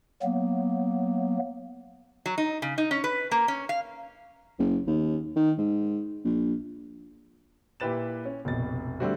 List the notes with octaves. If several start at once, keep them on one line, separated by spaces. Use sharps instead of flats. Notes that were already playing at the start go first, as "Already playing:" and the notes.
F#3 A#3 B3
F#3
D#4
C#3
D#4
C#4
B4
A#3
C#4
F5
F#1
D#2
D#3
G#2
A#1
A#2 E4 G4 B4 A6 E7
C#4
F1 A#1 B2 A6
D3 G3 A3 C4 F#4